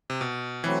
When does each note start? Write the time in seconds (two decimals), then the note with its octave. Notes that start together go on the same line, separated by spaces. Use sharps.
0.10 C3
0.21 B2
0.63 E3 F#3 A3 C4 B4